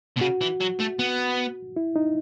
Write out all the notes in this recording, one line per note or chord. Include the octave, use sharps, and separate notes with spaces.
B2
C#3 F#4
E3
F#3
A3
B3
E4
D#4